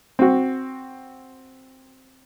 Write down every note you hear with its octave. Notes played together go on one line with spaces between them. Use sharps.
C4 F#4